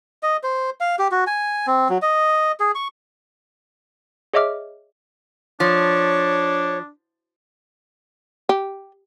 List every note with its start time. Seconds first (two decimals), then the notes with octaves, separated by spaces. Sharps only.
0.23 D#5
0.43 C5
0.80 F5
0.99 G4
1.12 F#4
1.27 G#5
1.67 C4
1.89 F#3
2.02 D#5
2.60 G#4
2.75 C#6
4.34 G#4 C#5 D#5 E5 D6 F6
5.60 F3 D4 C#5
8.49 G4